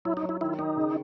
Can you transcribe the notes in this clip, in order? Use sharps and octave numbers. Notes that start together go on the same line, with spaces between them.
F#3 E4
D#4
F#3
E4
D#3 E4
D#3 D#4
C#3